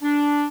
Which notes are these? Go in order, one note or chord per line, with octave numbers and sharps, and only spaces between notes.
D4